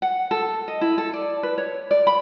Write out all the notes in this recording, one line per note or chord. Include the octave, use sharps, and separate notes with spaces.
F#5
A4
D#5
E4
A4
D5
B4
C#5
D5
B5